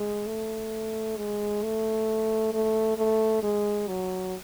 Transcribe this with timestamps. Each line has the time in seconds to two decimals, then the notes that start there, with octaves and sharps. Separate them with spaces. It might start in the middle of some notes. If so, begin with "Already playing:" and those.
Already playing: G#3
0.27 A3
1.17 G#3
1.63 A3
2.53 A3
2.98 A3
3.43 G#3
3.88 F#3